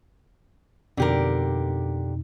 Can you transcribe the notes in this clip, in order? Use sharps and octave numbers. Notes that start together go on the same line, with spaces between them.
F2 B2 D3 D#4 G4 A#4